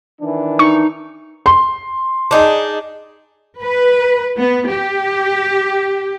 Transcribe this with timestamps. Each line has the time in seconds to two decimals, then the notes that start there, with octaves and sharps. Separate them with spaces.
0.21 D#3 E3 D4
0.59 D#4 C#6
1.46 C6
2.31 D4 D#4 G#4
3.62 B4
4.37 B3
4.69 G4